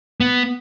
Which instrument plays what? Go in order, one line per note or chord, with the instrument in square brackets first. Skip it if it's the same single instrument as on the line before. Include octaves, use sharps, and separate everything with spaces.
[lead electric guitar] B3